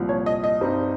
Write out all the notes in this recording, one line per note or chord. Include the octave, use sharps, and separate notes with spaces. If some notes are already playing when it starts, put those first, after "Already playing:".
Already playing: C2 A#2 F3
C#5
D#5
D#5
G2 G3 C4 D#4